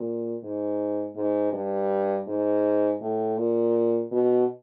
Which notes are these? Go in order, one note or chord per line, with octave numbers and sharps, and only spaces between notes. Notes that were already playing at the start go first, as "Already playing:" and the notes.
Already playing: A#2
G#2
G#2
G2
G#2
A2
A#2
B2